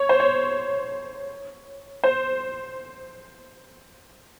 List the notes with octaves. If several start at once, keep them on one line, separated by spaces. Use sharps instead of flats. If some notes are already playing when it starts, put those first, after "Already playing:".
Already playing: C#5
C5
C#5
C5